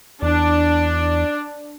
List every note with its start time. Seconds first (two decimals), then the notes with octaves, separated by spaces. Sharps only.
0.22 E2 D4